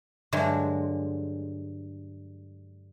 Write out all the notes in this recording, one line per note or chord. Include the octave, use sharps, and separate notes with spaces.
G2 D3 F#3 G#3